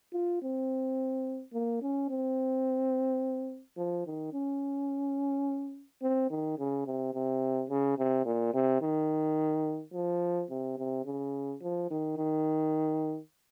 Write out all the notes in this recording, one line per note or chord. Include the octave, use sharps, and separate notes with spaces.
F4
C4
A#3
C#4
C4
F3
D#3
C#4
C4
D#3
C#3
C3
C3
C#3
C3
A#2
C3
D#3
F3
C3
C3
C#3
F3
D#3
D#3